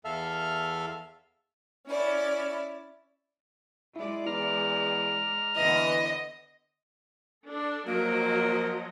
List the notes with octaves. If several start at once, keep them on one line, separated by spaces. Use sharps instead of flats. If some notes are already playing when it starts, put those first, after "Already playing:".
E2 A4 E5 F5 F6
C#4 E4 D5
G#3 E4 D5
E2 A#5 F6
D3 E3 B3 D#5
D4 A4
F3 F#3 A#3 D#5